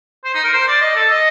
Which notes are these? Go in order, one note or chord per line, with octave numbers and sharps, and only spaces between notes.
C5
D#4
A#4
C5
D5
D#5
A4
D#5